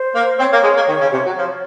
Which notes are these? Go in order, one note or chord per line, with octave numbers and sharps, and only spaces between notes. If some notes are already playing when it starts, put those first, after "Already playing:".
Already playing: C5
A#3
C4 C#5
A#3
G#3
A#3
D#3
C#3
C3
F#3
F3